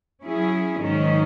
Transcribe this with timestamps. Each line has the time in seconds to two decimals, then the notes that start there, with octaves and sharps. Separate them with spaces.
0.23 F#3 C#4 E4 G#4
0.81 G#2 D#3 F#3 C#4